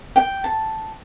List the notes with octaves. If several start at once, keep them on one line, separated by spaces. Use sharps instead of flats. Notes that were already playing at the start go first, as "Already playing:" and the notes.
G5
A5